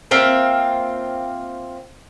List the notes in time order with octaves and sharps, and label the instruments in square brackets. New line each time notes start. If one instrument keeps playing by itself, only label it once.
[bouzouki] A#3 C4 F4 E5